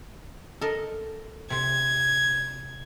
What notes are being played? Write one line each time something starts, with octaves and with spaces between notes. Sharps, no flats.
A4 A#4 D#5
C3 C4 G#6